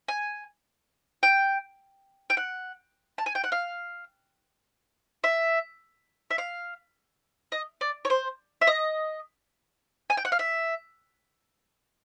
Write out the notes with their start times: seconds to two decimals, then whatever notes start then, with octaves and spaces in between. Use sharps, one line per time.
0.08 G#5
1.23 G5
2.30 G5
2.37 F#5
3.18 A5
3.26 G#5
3.35 G5
3.44 F#5
3.52 F5
5.24 E5
6.31 E5
6.38 F5
7.52 D#5
7.81 D5
8.05 C#5
8.10 C5
8.61 E5
8.67 D#5
10.10 G#5
10.17 G5
10.25 F#5
10.32 F5
10.39 E5